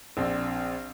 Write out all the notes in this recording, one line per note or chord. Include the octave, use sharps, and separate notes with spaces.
A#1 C4 D5